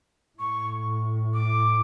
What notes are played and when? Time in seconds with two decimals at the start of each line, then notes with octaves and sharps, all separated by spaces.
0.39 A2 C#6
1.34 D6